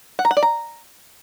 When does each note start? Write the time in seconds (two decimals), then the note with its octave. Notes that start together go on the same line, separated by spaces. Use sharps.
0.19 F#5
0.25 A#5
0.31 F#5
0.37 D5
0.43 A#5